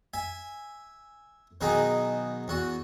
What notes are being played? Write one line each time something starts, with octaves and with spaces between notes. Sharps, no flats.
E5 G#5
B2 D#3 F#3 D#4 G#4
E2 F#4